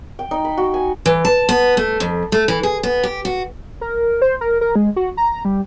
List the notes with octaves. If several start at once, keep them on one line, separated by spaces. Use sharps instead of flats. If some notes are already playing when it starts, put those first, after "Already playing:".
G5
D#4
B5
F#4
G#5
E3
A5
B3
A3
F2
A3
E3
G#4
B3
G4
F#4
A#4
C5
A#4
A#4
G#3
F#4
A#5
G3